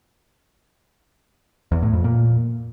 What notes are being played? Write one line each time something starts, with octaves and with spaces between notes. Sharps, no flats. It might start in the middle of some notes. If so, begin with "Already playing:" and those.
E2
A2
F2
A#2